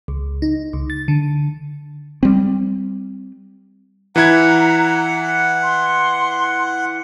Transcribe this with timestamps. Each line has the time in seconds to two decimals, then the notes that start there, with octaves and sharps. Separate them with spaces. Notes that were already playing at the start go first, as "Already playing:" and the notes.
0.08 C#2
0.42 D#4
0.73 C#2
0.90 A6
1.08 D3
2.23 G3 C4
4.16 E3 E4 F#5 A#5 G#6
5.63 C6